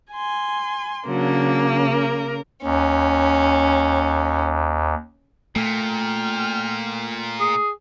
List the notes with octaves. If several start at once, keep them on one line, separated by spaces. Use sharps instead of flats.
G#5 C6
C#3 F#3 A#3 D4
A#4
D#2 C#4
A#2 A3 G5 F6
G#4